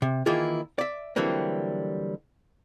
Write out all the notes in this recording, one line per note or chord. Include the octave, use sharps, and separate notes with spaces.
C3
D#3 E3 A#3 E4 F4 G#4
D5 E5
D3 E3 F#3 G3 A#3 C4